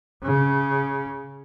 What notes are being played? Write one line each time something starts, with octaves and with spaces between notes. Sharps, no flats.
C#3